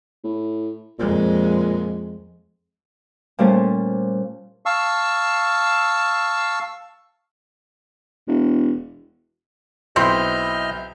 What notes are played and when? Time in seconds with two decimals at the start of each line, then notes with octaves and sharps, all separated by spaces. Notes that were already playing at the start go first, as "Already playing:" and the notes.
0.24 A2
0.99 F2 A#2 G#3
3.39 A#2 G3 A3 C#4 C5 A5
4.66 F5 A5 C#6 E6
8.27 E1
9.96 B1 C4 E4 D#5 E5 C6 F6 G6